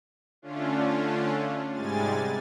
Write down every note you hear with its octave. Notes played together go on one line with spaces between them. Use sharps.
D3 A3 C#4 D4 F4
G#2 C3 G3 G#3 G#5 A6